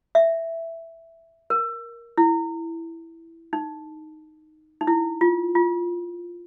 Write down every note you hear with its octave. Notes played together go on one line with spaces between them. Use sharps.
E5
A#4
E4
D#4
D#4
E4
F4
F4